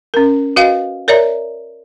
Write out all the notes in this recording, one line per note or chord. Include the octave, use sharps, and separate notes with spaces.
C#4 A#4
F#4 B4 D#5 F5 G5
A#4 C#5 D5 E5 A#5